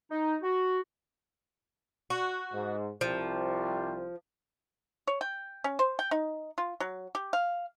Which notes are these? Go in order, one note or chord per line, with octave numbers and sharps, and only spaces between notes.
D#4
F#4
F#4
G#2
C2 F3 G3 C5
C#5
G5
C#4
C5
G5
D#4
F4
F#3
G4
F5